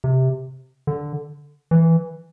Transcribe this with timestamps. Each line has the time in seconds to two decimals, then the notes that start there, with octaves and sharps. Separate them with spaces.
0.04 C3
0.87 D3
1.71 E3